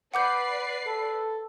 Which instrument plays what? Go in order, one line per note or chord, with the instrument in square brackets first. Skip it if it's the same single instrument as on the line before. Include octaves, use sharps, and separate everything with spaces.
[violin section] B4 D5 C7 [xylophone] F#5 D6 G6
[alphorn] A4